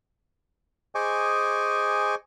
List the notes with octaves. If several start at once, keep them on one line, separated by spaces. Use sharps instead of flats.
G#4 C5 D#5 G#5 C#6 D6